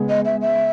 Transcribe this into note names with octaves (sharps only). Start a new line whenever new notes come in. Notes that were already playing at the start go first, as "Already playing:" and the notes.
Already playing: C#3 G#3 B3
D#5
E5
E5